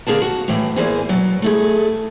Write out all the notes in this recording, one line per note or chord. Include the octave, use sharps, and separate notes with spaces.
D3 A#3 D#4 G#4 A#4 A5
F#4
A2 E3
E2 E3 A#3 G#4 C5 G#5
B2 F#3
A3 E4 G#4